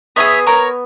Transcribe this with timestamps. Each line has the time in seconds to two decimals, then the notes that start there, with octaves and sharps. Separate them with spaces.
0.16 B3 E4 G#4 C#5 E5
0.47 A#4 C#5